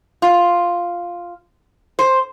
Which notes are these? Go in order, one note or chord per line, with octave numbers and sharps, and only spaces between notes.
F4
C5